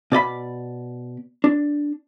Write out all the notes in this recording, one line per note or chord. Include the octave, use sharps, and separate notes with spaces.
B2 D5 D#5 B5
D4